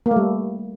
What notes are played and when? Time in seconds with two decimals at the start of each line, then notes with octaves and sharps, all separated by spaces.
0.06 A#3
0.11 A3
0.16 G3